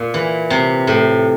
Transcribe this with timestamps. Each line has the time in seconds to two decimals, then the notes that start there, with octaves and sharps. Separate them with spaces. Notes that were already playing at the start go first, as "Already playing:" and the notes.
Already playing: A#2
0.14 E3
0.50 C3
0.87 A2